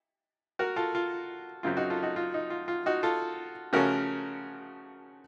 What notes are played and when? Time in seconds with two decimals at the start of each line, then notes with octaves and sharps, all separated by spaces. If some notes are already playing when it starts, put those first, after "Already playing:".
0.59 F#4 A#4
0.76 F4 A4
0.95 F4
1.63 F#2 C#3 F#3 C4 F4
1.77 D#4 F#4
1.90 F4 A4
2.03 D#4 F#4
2.16 F4
2.34 D#4
2.50 F4
2.68 F4
2.86 D#4 F#4
3.03 F4 A4
3.73 C#3 F3 A3 C#4 F#4 A#4